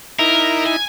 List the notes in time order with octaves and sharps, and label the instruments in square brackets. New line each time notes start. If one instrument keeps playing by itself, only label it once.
[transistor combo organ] D#4 E4 [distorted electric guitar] A#4
[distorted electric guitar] G#5